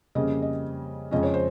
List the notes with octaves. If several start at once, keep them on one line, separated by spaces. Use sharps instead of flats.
F2 C#3 G3 A#3 C#4 D#5
D#5
F2 C#3 F3 G#3 C#4 D#5
C#5
C5